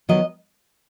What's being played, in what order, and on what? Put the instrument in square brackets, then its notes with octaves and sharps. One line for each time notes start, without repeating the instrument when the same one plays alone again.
[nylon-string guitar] D#3 F#3 B3 D#5